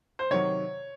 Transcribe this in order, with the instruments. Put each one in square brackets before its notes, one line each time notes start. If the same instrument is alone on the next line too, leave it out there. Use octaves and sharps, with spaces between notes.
[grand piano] C5
[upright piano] C3 D#3 F#3 [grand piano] C#5